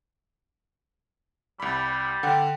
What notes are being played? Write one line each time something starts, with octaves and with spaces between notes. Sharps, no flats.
C2 G3 B5
D3 F#5 G5